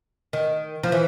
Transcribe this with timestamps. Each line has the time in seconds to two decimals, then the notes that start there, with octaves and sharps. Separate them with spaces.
0.33 D#3
0.83 F3
0.92 E3